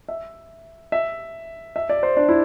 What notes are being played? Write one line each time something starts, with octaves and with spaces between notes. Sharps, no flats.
E5
E5
E5
D5
C5
D4
E4